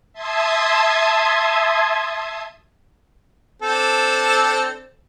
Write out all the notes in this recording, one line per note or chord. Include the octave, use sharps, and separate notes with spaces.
E5 A5 C6 D#6 G#6
C4 D4 A4